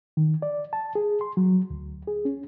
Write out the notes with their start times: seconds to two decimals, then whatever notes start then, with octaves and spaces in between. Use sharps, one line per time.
0.17 D#3
0.42 D5
0.73 A5
0.95 G#4
1.21 C6
1.37 F#3
1.70 D2
2.07 G#4
2.25 C#4